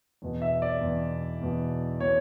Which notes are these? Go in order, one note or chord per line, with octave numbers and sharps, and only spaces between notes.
E2 B2
E5
D5
E2
B2
E2 B2
B2 C#5